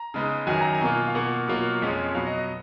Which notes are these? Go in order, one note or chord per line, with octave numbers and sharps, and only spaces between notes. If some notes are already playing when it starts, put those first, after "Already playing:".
Already playing: A#5
C#3 G#3 B3 D#4
F#2 D#3 F#3 G#5
A#5
G#5
B2 A#3 F4
F5
B2 A#3 F4 F#5
B2 F#3 A#3 F4
F2 F3 G#3 C#4 F4
B2 F#3 B3 F5
D#5
D#5